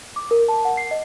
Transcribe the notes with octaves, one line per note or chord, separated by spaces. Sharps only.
D6
A#4
A5
F#5
C7
D#5